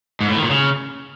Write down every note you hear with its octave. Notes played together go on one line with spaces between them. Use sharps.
G#2
A2
D#3
A#2
C#3